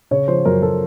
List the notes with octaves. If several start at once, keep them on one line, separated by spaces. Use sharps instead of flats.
C#3 C#5
F3 C5
F#2 A#4
F#2 A4